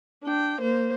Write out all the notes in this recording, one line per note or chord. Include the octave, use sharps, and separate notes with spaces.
D4 G5
A#3 C5